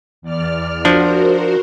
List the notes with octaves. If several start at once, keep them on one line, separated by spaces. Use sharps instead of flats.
E2 D5 F6
F3 D4 F#4 A#4 C5